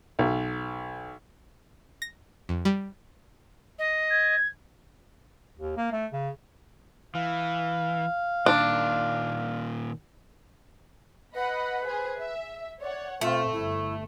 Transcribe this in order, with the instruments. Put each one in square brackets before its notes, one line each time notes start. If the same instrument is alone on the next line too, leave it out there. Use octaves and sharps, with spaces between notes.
[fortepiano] B1
[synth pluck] A#6
F2
G3
[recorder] D#5
[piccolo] G#6
[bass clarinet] D#2
A#3
A3
C#3
[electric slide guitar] E3 [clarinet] F5
[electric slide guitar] A#2 D#3 [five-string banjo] D4
[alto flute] B4 [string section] D#5 F#5 B5
[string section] G#4 C5
E5
[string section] C#5 F#5 [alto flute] D5
[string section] B2 C4 [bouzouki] A3 [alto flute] F4
[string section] G1 [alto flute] E4